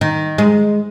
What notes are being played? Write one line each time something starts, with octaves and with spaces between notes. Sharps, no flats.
D#3
G#3